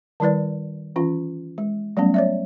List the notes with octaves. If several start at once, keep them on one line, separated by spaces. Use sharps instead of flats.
D#3 G3 E4 B4 D5
E3 C#4 F4
G#3
F#3 G3 A3 B3 C#4
C#5 D5 E5